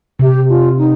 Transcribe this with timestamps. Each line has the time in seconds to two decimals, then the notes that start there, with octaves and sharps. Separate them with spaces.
0.19 C3 G4
0.49 F4
0.78 D#4